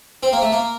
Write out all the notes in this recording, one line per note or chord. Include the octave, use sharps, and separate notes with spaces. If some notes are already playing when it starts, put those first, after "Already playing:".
C4
A#3
A3
A#3